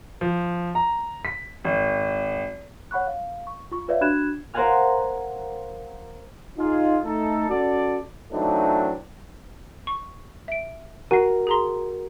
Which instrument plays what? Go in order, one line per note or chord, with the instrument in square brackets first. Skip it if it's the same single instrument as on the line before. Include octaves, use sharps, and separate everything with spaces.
[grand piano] F3
A#5
B6
G#1
[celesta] C#5 F#5 B5 C#6 F#6
F5
C#6
F4 C#6
F4 B4 C#5 D5 E5 F5
D4 F#4 B5 F#6 G#6 E7
[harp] A#4 C5 F5 F#5 G#5 F6
[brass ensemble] D#4 F4 G#4
A3 D#4 A4
C#4 F#4 A4 D5
[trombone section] E3 F#3 A3 C4 D4 D#4
[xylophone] C#6
E5 D7
[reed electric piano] F#4 A#4 [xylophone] G#5 C7
[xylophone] G#4 A#5 C6